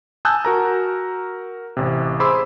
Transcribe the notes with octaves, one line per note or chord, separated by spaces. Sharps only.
G#5 A5 D#6 E6 F#6 G6
F#4 A#4 A#5
A1 C3
G#4 C5 B5 C6 D6 E6